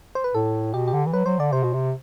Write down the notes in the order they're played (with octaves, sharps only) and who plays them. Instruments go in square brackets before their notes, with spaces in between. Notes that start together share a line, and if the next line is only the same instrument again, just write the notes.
[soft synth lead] C5
B4
[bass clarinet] A2 [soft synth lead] A4
[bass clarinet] B2 [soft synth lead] G4
[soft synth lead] G4
[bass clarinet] D3
E3
[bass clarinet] F#3 [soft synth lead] B4
[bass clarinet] F#3 [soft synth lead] C5
[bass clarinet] D3 [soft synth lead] D5
[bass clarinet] C3 [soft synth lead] C5
[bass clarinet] B2
C3